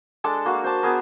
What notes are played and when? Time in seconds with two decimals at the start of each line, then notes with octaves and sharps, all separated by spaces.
0.24 G#3 D4 A4 A5
0.46 A#3 F#4 F5
0.64 C5 A5
0.83 B3 G#4 A#4